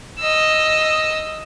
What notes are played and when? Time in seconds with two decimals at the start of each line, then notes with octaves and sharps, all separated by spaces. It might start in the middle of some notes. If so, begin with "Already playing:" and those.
0.19 D#5 E6